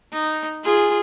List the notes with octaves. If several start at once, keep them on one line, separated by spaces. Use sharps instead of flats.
D#4
F4 G#4